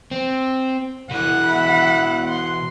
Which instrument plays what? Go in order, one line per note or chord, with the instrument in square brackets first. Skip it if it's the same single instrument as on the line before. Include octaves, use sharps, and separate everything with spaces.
[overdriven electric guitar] C4
[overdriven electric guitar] B2 E3 [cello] F#5
[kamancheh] E5 B5
C6